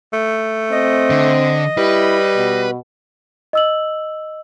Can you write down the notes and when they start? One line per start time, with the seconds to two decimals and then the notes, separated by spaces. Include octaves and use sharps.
0.13 A3
0.71 C4 D#5
1.10 D3
1.78 G3 E4 B4
2.36 B2
3.53 D#5 E6 F#7